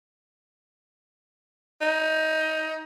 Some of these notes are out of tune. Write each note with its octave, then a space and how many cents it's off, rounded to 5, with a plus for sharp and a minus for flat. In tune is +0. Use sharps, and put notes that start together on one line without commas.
D#4 +20